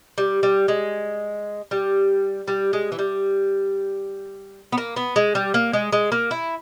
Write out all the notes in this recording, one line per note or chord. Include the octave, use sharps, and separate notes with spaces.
G3
G3
G#3
G3
G3
G#3
E3
G3
B3
A#3
B3
G#3
G3
A#3
G#3
G#3
A#3
E4